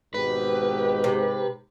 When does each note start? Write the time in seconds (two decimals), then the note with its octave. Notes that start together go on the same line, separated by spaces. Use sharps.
0.14 G#1 G#2 B2 G4 B4
1.04 C3